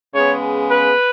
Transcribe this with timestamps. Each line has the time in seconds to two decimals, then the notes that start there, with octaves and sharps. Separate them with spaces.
0.14 C#3 G#3 B3 C#5
0.69 B4